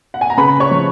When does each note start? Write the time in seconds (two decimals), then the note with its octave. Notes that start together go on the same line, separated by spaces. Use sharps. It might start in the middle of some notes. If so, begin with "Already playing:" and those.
0.14 F#5
0.21 G#5
0.30 A#5
0.37 C#3 B4 B5
0.60 C#5 C#6
0.71 F3